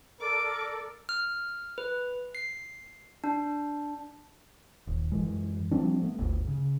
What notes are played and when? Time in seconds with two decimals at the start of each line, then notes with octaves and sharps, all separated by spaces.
0.21 A4 A#4 D5 D6
1.09 F6
1.78 B4
2.35 C7
3.24 D4
4.87 D#1
5.12 F#2 E3 G#3
5.71 F3 G3 C4 D4
6.02 A3 B3
6.19 G1 D2
6.48 C#3